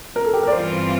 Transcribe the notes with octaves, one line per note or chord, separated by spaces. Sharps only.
A#4
A4
G4
A#4
D5
G2 E3 G3 C4 F4 C5